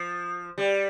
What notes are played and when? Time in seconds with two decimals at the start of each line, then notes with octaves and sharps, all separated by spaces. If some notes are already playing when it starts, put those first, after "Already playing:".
Already playing: F3
0.58 G3